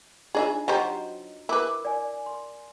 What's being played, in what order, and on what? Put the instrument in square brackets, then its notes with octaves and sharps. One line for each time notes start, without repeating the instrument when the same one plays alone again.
[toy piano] D4 D#4 F4 [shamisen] G#4 D5 E5
[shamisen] F#3 G4 C5 [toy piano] F#4 D#5 A#5
[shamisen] E4 B4 [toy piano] A#4 D6
[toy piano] D5 G#5
C6